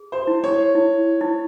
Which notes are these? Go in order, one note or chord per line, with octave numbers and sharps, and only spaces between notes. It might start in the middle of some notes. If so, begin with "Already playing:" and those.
Already playing: G#4
C5
E4
C#5
E4
E4